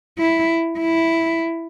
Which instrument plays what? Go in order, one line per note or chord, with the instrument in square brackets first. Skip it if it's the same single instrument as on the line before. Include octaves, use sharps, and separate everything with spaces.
[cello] E4
E4